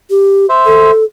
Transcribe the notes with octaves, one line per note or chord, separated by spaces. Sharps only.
G4
C5 E5
A4